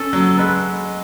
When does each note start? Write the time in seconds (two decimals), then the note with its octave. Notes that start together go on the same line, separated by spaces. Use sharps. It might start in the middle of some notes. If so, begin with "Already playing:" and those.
Already playing: C#4 A4
0.13 F#3
0.38 G#3 B4